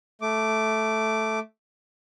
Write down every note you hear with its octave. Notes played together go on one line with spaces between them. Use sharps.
A3 D6